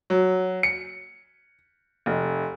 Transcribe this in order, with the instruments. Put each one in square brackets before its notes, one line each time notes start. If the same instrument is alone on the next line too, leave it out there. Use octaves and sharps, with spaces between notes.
[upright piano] F#3
C#7
F1